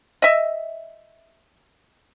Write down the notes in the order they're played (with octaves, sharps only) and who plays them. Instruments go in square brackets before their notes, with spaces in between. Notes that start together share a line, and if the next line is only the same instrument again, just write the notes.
[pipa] D#5 E5